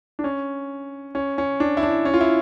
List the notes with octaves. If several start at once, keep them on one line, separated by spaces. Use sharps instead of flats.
D4
C#4
C#4
C#4
D4
E4
D4
C#4
F4
E4